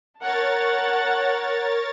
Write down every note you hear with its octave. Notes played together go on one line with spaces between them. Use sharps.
A#4 C#5 F#5 A5 A6